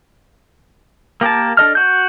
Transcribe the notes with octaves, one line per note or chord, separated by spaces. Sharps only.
A#3 G4 A#4 A5
D4 A4 D#5 F6
F#4 G6